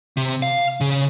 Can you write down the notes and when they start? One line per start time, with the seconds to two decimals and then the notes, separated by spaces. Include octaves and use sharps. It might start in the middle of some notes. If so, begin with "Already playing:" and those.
0.17 C3
0.42 F5
0.81 C#3